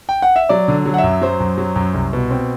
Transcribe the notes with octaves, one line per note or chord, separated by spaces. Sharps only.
G5
F#5
E5
F#3 D5
D3
F#3
F#5
E5
F#2
F#3 C5
F#2
F#3
F#2
C2
B2
C4